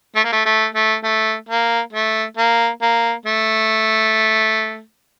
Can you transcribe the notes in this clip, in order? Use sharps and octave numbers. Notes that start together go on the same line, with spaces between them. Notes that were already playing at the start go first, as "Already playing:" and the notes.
A3
A#3
A3
A3
A3
A3
A#3
A3
A#3
A#3
A3